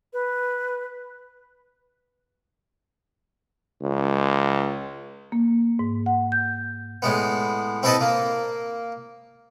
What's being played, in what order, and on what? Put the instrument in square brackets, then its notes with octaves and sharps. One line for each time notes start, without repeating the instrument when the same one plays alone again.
[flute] B4
[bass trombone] C#2
[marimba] A#3
G#2
F#5
G6
[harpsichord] A2 G#3 B3
C4 E4 A4 B4 D#5 A5
A#3